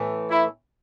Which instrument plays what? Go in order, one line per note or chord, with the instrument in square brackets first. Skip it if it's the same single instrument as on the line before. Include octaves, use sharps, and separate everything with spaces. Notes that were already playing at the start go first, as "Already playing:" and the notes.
Already playing: [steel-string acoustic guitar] A2 E3 A3
[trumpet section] E4